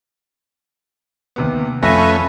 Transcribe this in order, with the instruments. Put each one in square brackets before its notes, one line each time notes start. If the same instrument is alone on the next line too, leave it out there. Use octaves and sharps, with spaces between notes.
[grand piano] D#2 C3 B3
[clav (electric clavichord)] F2 [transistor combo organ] A3 C#4 [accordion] B4 E5 G#5 [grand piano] A#6